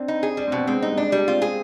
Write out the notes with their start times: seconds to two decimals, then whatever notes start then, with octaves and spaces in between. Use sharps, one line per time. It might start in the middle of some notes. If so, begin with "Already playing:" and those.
Already playing: C4 D4
0.08 D#4
0.23 G#4
0.37 G3 D4
0.48 C4
0.52 B2
0.58 B3
0.67 G#3 C4
0.82 G3 D#4
0.91 B3
0.97 G#3 D4
1.12 G3
1.28 C4 F4
1.42 C4 G#4